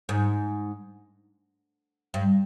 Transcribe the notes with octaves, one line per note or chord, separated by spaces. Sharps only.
G#2
G2